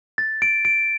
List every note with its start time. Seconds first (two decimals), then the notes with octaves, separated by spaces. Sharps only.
0.18 A6
0.42 D7
0.65 D7